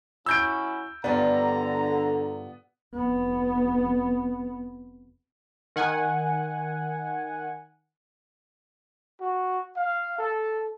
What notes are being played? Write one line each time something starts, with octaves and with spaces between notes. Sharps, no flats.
F#3 C#4 E4 E6 G6 D7
G2 D3 B3 F4 D5 A#5
F1 B3
D#3 F#5 G#5
F#4
F5
A4